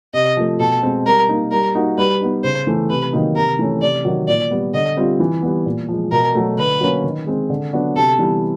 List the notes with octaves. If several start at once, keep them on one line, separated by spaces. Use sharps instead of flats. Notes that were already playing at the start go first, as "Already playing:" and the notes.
C3 D#5
F3 A3
B2 A4
G#3 C4
G3 A#4
A#3 D#4
G3 A#4
A#3 D#4 F#4
G3 B4
B3 D#4
C#3 C5
E3 A3
C3 B4
D#3 F#3 A#3 D#4
C3 A#4
E3 A3 C#4
C3 D5
D#3 F#3
A#2 D5
G3 B3
D3 D#5
G3 C4 F4
E3
G3 B3
A#2
F3 G#3
B2 A#4
F#3 A3
D3 B4
F#3 A#3 C#4
D#3
G#3 C4
D3
F#3 B3 D4 F#4
C3 A4
E3 G3 B3 E4